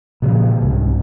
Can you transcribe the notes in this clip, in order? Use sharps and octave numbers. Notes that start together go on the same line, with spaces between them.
A#2 C#3 F3
C2 G#2 C3